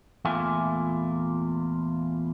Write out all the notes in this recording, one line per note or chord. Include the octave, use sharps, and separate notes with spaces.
E2 A#2 A3 E4 F4 G#5